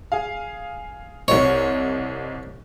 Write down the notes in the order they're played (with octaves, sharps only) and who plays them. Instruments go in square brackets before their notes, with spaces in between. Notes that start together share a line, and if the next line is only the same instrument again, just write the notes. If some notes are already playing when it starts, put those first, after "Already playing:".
[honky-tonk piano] G#4 F5
[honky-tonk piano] C2 C4 D#4 [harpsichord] C#5